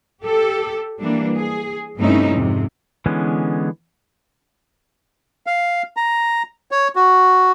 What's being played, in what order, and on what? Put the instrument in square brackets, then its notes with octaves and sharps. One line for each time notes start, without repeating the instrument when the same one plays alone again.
[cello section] G4 A4
E3 G3 A#3 D4
G#4
G2 C3 A3 C#4 D#4 E4
F2 G#2 C3
[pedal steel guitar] D3 E3 G#3 B3 C#4
[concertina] F5
A#5
C#5
F#4